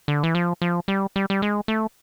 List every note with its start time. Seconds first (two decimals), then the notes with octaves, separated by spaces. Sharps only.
0.08 D3
0.23 E3
0.35 F3
0.62 F3
0.88 G3
1.16 G3
1.30 G3
1.42 G#3
1.68 A3